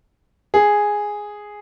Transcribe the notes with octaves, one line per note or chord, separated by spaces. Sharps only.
G#4